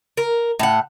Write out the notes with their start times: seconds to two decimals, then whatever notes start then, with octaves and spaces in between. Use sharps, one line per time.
0.17 A#4
0.59 A2 F#5